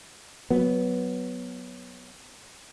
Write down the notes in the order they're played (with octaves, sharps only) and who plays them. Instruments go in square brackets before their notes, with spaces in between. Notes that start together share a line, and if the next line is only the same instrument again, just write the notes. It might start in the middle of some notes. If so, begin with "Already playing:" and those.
[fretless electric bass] F#3 B3